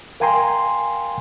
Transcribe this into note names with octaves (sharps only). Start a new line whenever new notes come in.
A#4 F5 G5 G#5 A#5 C6